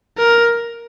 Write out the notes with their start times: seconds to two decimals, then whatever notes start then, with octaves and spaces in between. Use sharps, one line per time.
0.18 A#4